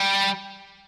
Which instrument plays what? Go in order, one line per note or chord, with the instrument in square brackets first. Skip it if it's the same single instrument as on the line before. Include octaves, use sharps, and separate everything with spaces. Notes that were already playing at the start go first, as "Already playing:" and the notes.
Already playing: [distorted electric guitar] G3